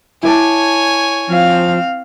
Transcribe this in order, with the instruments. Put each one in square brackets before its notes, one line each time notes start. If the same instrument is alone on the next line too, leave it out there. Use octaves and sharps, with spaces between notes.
[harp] E4 D5 A5 [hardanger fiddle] C#5 G#5
[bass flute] F3 [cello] C4 F5